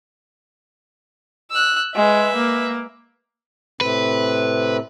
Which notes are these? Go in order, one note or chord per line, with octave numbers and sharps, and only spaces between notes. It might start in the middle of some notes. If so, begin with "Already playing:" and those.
E6 F#6
G#3 B4 E5
A#3
A2 C3 C4 B4